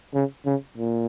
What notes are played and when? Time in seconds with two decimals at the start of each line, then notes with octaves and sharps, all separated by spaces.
0.14 C#3
0.46 C#3
0.77 A#2